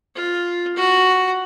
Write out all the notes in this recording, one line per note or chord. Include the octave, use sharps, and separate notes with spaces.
F4
F#4